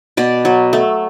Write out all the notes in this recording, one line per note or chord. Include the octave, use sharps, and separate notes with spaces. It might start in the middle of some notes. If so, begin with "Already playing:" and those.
B2 D5
F#3
A3